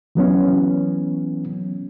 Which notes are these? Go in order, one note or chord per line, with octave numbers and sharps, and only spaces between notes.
E3 F#3 B3 C#4